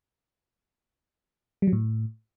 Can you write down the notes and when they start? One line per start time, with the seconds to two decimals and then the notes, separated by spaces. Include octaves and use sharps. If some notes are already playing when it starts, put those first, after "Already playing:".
1.62 G3
1.67 F#3
1.73 A2